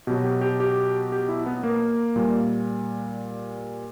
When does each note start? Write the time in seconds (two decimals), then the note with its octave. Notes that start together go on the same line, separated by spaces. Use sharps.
0.07 B2 F#3 G4
0.24 G4
0.41 G4
0.60 G4
1.12 G4
1.29 E4
1.46 B3
1.63 A#3
2.16 A#2 G3